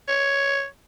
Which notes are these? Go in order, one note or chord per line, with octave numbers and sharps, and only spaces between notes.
C#5